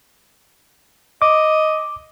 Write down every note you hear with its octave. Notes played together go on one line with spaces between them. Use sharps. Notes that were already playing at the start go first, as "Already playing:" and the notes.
D#5 D6